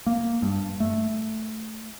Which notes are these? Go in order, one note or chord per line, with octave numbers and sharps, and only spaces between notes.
A#3
G2
A3